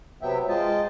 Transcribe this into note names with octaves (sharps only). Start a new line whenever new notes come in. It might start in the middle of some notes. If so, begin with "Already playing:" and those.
C3 F#3 B3 E5 G5
G#3 F4 D#5 G5 A5